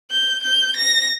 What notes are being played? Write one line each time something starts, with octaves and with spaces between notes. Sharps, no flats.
G6
G6
A#6